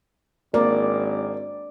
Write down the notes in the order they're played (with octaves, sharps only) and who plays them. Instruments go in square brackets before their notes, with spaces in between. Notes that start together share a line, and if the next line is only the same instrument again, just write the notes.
[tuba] G#1 [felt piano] A#3 [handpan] D5